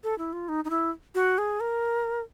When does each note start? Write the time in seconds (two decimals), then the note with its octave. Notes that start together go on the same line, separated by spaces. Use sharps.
0.04 A4
0.18 E4
0.33 F4
0.49 D#4
0.65 D#4
0.70 E4
1.15 F#4
1.38 G#4
1.60 A#4